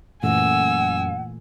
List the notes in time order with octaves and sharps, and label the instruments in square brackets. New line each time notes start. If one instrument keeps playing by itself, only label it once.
[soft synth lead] F#2 [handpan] A#2 E3 A3 [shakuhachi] F#5 [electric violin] G#5 E6